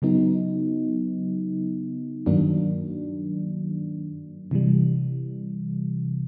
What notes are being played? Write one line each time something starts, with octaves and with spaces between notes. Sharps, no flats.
C#3 F#3 B3 D#4
G2 D#3 F#3 A#3 D4
C3 E3 G3